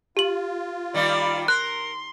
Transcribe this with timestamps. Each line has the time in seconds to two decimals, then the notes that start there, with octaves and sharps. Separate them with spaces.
0.17 F4 G4 F#7
0.94 D#3 G3 D#4 D5
1.48 A#4 C6 F#6